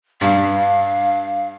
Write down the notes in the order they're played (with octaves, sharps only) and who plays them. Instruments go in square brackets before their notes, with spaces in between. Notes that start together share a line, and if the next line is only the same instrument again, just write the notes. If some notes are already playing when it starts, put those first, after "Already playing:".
[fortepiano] G2 [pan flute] F5